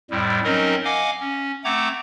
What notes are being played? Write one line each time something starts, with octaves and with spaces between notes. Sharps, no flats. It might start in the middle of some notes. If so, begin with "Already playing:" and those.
F2 A2 G3
F#3 C4 C#4 D#4 A#4 D#5
D#5 F5 F#5 G#5 D6
C#4
A3 C4 F#5 A#5 D6 G#6